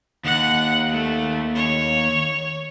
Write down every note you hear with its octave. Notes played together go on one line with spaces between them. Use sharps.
D#2 F#5 F#6
A3
C#5